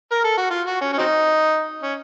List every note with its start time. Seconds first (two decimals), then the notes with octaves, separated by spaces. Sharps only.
0.12 A#4
0.24 A4
0.37 F#4
0.50 F4
0.66 F#4
0.81 C#4
0.93 C#4
0.98 F#3 C4 D#4
1.82 C#4